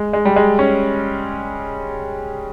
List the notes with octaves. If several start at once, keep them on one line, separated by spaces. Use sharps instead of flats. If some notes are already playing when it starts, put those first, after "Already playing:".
Already playing: G#3
G#3
G3
G#3
C#4